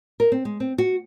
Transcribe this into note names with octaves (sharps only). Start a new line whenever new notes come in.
A#4
C4
G#3
C4
F#4